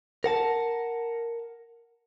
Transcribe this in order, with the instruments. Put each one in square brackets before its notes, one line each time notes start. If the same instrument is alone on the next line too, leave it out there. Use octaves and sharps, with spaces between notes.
[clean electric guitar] A#4 F#5 A5